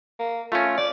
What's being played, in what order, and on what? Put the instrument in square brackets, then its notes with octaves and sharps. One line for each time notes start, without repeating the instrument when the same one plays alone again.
[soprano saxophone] A#3
[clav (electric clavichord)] A3 C#4 [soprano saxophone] F4
[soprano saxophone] D5